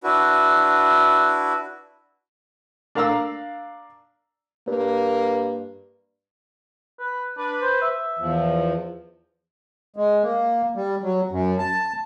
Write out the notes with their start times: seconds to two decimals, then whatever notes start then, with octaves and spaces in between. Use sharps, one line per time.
0.04 D4 E4 F#4 B4
2.95 D4 A#4 F5 A#5 E6
4.67 G2 A#3
6.99 B4
7.38 D4 B4
7.62 C5
7.82 E5
8.19 E2 F3
9.96 G#3
10.23 A#3
10.76 G3
11.03 F#3
11.31 F#2
11.58 A5